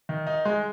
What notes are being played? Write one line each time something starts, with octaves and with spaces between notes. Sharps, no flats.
D#3
D#4
G#3